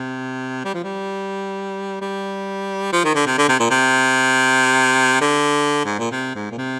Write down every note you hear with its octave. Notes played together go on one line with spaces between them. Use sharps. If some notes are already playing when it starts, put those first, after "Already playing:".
Already playing: C3
G3
F3
G3
G3
F3
D#3
D3
C3
D3
C3
A#2
C3
D3
G#2
A#2
C3
G#2
A#2
C3